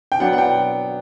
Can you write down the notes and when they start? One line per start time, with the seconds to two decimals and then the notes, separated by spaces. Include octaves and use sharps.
0.12 G5
0.20 F#3 B3 D4 F#5
0.33 F#5
0.38 G5